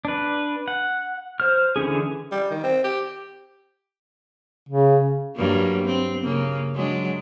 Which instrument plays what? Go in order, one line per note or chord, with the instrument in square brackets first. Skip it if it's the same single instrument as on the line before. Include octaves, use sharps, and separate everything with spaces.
[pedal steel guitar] D4 B4
F#5
C5 F6
D3 E3 C#4 G#4
[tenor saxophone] G3
D#3
C4
G4
[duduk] C#3
[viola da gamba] G2 F#3 A#3
C4
C#3 A#3
F#3 G#3 D4